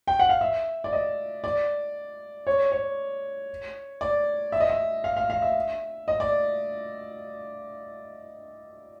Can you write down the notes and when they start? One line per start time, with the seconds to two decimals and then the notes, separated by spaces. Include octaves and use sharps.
0.07 G5
0.19 F#5
0.29 F5
0.41 E5
0.84 D5
0.93 D#5
1.44 D5
2.47 C#5
2.72 C#5
4.01 D5
4.52 E5
4.60 D#5
4.70 E5
5.04 F5
5.17 F5
5.30 F5
5.42 E5
6.08 D#5
6.20 D5